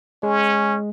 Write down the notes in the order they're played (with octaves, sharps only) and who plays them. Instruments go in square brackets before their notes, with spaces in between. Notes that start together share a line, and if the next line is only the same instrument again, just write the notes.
[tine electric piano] G#3 [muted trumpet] C#4